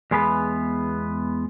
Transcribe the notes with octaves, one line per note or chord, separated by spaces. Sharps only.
E2 G#3 B3 B4